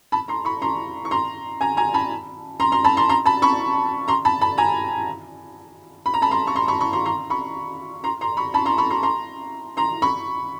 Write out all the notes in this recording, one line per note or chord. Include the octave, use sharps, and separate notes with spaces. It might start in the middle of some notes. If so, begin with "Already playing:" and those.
A5 B5
A#5 C6
B5 C#6
A#5 C6
C#6
A#5 C6
G#5 A#5
G#5 A#5
A5 B5
A#5 C6
A#5 C6
A5 B5
A#5 C6
A#5 C6
A5 B5
B5 C#6
A#5 C6
A5 B5
A5 B5
G#5 A#5
B5
A#5
A5 B5
A#5 C6
C#6
A#5 C6
B5 C#6
B5 C#6
A#5 C6
A#5 C6
B5 C#6
A#5 C6
A#5 C6
B5 C#6
A5 B5
A#5 C6
B5 C#6
A#5 C6
A#5 C6
A#5 C6
B5 C#6